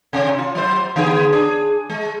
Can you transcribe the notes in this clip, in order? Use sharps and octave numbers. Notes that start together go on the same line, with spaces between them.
C3 C#4
F4
F#3 C5
D3 B3 G#4
D4 G#4
G#3